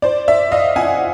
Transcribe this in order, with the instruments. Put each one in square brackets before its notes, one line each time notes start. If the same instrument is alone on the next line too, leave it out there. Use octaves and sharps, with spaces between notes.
[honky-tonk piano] C5 D5
D5 E5
D#5 F5
F#5 G#5